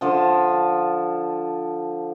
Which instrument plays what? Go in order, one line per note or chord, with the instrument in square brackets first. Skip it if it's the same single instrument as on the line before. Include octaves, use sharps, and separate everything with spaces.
[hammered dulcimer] D3 F3 A5